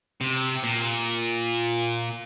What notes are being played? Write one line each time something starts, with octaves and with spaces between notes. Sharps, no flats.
C3
A#2